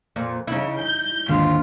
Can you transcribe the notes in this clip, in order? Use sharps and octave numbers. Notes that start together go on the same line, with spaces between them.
F2 A#2
C#3 D#4 E4
G6
D#2 G#2 D3 F4